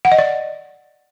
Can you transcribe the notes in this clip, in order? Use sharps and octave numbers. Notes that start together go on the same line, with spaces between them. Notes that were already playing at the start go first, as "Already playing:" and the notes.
F#5
D#5
D5